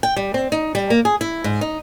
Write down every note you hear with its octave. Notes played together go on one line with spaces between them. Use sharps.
G5
G3
C4
D#4
G3
A#3
G#4
E4
G#2
D#4